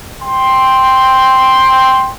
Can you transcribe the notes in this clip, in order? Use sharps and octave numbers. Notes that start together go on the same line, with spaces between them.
G5 C6